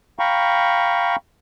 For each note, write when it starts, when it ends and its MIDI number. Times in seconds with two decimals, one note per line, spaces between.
0.19 1.16 77
0.19 1.16 79
0.19 1.16 82
0.19 1.16 83
0.19 1.16 85